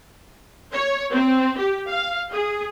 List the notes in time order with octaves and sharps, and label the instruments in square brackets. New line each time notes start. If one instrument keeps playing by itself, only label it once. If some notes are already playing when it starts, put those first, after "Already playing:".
[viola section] C#5
C4
G4
F5
G#4